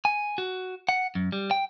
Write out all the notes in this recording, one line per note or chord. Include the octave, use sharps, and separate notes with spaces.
G#5
F#4
F#5
F#2
G3
G5